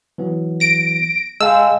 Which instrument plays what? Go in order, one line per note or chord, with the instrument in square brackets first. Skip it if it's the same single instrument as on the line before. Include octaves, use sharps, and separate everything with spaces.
[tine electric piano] E3 F#3 B3
[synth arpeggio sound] A#6 D7
[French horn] G#3 [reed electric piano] D#5 F5 G5 [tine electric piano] A5 [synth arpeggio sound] E6